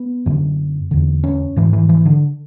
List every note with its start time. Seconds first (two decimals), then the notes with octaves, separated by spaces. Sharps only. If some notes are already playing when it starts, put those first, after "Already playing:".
Already playing: B3
0.26 F#2 D3
0.91 E2 D3
1.24 C#4
1.56 G#2 E3
1.73 E3
1.89 E3
2.05 D3